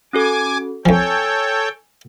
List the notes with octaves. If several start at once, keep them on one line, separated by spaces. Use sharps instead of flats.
C#4 F#4 A4 G#5 D6
F2 F3 A4 C#5 G5 G#5